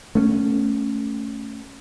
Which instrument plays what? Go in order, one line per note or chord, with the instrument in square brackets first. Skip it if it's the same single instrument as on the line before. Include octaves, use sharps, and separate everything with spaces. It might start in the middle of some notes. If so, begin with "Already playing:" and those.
[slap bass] A3 B3 C#4